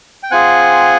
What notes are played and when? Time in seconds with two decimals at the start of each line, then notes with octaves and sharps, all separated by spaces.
0.23 G5
0.31 C4 F4 G#4 F#5 G#5